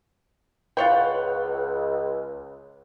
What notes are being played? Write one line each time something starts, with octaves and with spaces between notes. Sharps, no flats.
C#2 F4 B4 C#5 F#5 G5